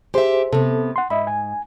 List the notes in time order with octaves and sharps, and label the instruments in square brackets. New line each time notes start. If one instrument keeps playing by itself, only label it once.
[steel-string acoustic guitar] G4 E5 [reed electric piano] G#4 C5
[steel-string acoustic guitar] C3 B3 [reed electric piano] A4
[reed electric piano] F#5 C6
[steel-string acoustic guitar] G#2 [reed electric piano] D#5 E5 B5
[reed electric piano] G#5